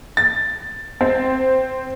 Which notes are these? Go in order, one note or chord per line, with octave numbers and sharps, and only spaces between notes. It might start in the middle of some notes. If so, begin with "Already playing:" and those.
A6
C4